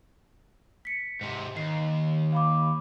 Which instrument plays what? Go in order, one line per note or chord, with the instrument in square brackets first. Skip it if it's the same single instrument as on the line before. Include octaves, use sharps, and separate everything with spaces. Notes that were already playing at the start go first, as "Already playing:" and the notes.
[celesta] B6 C#7
[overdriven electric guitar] G#2 C3
[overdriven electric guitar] D#2 [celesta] C7
[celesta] F5 B5 D6